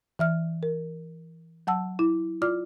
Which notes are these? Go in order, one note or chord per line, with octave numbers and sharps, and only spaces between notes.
E3 E5 F6
A#4
F#3 F#5 A5 E6
E4
F4 D5 D6 F6